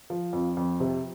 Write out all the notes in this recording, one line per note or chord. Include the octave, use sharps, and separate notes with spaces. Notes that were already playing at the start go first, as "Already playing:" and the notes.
F3
F2
F2
C3